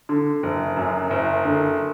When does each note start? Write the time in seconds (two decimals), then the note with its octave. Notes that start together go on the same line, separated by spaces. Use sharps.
0.09 D3
0.43 F#1
0.77 F#2
1.11 F#1
1.45 D3